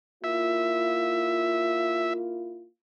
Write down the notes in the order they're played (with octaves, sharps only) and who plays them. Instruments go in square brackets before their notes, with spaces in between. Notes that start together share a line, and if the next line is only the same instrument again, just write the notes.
[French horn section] A#3 E4 F4 [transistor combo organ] E5